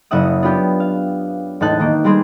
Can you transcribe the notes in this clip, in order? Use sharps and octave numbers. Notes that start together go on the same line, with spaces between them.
F#1 C#3 E5 F#5 D#6
B3 D4 F4 G4
F5
E1 A2 D#4 A5 F#6
D#3 A#3
G3 G#3 C4 G#4